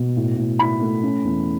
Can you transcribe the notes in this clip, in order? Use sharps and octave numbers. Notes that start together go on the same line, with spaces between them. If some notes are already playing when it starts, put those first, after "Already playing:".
Already playing: B2
A2
A2
E4 B5
A3
C#4
E2